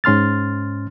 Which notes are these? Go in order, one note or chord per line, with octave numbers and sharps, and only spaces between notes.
G#2 C#4 C6 F6 A6